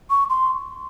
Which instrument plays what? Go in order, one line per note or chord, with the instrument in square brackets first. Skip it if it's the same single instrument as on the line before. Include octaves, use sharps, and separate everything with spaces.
[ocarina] C#6
C6